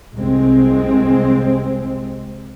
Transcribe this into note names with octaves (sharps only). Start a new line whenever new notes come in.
C2 G#3 C4